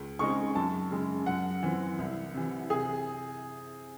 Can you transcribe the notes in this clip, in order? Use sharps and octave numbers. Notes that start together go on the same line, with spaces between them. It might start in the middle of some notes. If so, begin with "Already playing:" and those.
Already playing: C#2
C#3 G#3 C4 D#4 C#6
F#2 A5
C#3 G#3
F#2 F#5
E3 C4
C2
C3 E3
C3 G#4